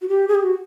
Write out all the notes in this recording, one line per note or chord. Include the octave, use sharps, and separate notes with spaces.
F#4
G4
G#4
G4
F#4